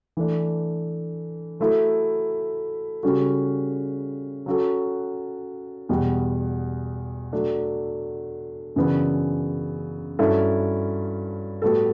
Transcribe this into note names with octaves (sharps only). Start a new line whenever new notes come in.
E3 A3 D4
F#3 A3 E4 A4
C#3 G3 C#4 F#4 A4
F#3 C#4 F#4 A4
E2 B2 G3
F#3 A3 D4
F#2 C#3 E3 B3 D4
G2 F#3 C#4 E4 A4
A2 G3 B3 F#4 A4